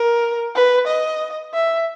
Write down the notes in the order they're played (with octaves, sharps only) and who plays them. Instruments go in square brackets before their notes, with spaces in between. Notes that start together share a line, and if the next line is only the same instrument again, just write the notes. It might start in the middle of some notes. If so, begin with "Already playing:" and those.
Already playing: [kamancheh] A#4
B4
D#5
E5